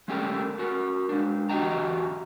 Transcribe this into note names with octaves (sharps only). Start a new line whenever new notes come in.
G#3 A3 C#4 G4 G#4 A#4
F#4 A#4
G#3 D4
E2 F#4 G4 D#5 G5 A#5